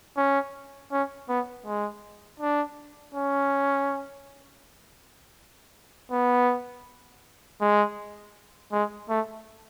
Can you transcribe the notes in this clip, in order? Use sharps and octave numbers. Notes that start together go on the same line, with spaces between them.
C#4
C#4
B3
G#3
D4
C#4
B3
G#3
G#3
A3